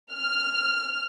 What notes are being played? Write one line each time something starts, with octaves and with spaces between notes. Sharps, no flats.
F6